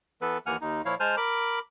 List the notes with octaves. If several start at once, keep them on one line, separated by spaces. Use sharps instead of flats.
E3 B3 A4 B4
D#2 E3 A#3 F#5 G#5 F6
D#2 D#4
A#2 F3 E4 C#5 F5
G#3 C5 G#5 A5 F6 G6
A#4 B5 D6